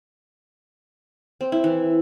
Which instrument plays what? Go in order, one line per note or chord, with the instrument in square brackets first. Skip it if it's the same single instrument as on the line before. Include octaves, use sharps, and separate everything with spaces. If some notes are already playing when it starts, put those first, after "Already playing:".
[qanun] C4
E4
E3